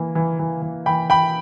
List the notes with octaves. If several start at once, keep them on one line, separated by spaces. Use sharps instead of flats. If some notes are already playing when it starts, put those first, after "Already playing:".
Already playing: E3 A#3
E3
E3
E3
E3 G5 B5
E3 G5 B5